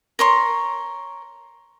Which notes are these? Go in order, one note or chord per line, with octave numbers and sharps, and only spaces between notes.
A#4 C#5 C6